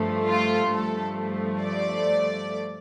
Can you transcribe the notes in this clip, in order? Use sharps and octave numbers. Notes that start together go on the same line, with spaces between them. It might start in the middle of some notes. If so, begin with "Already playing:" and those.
Already playing: G2 F3 A3
F4
G2 F3 A3 A4
D5